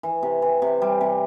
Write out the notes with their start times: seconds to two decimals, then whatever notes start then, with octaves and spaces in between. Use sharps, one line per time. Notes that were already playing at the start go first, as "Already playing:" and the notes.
0.03 E3
0.23 C3
0.42 E3
0.62 C3
0.82 G3
1.01 C3